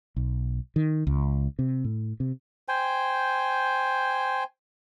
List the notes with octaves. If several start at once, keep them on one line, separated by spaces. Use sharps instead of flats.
B1
D#3
C#2
C3
A2
C3
C5 G5 G#5